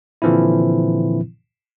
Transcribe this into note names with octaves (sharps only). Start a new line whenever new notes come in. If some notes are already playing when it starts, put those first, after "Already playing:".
A#2 D3 E3 F3 C4 E4